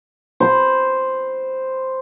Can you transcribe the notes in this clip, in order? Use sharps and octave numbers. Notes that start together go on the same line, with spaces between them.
C5 B5